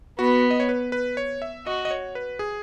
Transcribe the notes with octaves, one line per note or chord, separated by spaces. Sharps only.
B3 F#4
D#5
C#5
B4
B4
C#5
E5
F#4 D#5
D#5
C#5
B4
G#4